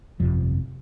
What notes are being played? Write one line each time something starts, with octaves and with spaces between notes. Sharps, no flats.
G1 F2 C3 F3